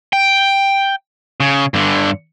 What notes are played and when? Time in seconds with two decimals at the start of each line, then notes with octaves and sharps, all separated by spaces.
0.13 G5
1.40 C#3
1.74 G2 D3